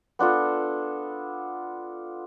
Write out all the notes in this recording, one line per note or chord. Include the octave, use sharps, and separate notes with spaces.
B3 D4 F4 A4